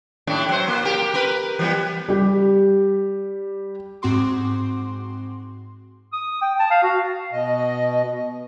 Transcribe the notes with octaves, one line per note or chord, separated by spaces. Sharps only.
D#2 A2 D4
F#3 C5
A#3
G4 A#4
A#4 B4
E3 G3 B3
G3 G4
G#2 C4 F#4 C6 D6
D#6
G5
A5
F5
F#4
B2 D#5